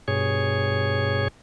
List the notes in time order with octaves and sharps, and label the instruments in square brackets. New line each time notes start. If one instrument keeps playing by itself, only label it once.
[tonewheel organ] G2 B2 G#4 C#5